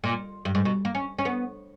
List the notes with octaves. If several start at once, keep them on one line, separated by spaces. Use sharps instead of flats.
A#2
G2
G#2
B2
A#3
C#4
C#4
B3